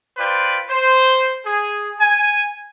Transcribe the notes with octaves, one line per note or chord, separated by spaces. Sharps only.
F4 B4 C5 D5 G5
C5
G#4
G#5